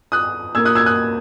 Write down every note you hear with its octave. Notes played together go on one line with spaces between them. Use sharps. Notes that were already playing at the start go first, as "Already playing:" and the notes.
D#6 F#6
A#2 A#3 E6 G#6
D#6 F#6
E6 G#6
D#6 F#6